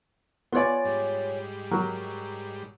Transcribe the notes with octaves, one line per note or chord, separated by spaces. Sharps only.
B3 F4 C#5 D5 G#5
G#2 G3
F#3 A#4